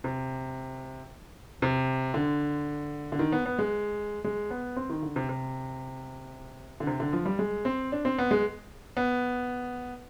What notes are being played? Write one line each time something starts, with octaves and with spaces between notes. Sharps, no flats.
C3
C3
D3
D3
D#3
B3
B3
G#3
G#3
B3
C4
D#3
D3
C3
C3
D3
C3
D3
F3
G3
G#3
C4
D4
C4
B3
G#3
B3